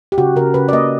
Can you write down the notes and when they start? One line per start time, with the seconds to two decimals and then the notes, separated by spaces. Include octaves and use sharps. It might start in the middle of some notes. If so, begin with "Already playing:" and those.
0.12 G4
0.18 C#3 F#4
0.36 C#3 A#4
0.54 C#3 B4
0.69 D5
0.73 A#3 D#5